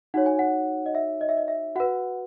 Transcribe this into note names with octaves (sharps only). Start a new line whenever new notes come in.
D#4 F#4 C#5 F#5
G#5
F#5
D#5
E5
D#5
E5
D#5
E5
F#4 B4 F#5